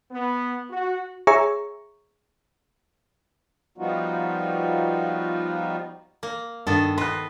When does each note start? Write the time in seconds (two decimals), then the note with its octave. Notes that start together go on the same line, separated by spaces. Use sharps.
0.11 B3
0.71 F#4
1.27 G#4 C#5 E5 G#5 A#5 C#6
3.78 F3 G3 B3 D#4 F4 F#4
6.23 A#3
6.67 G2 D#3 B3 A4
6.98 B4 D#5 C6 F#6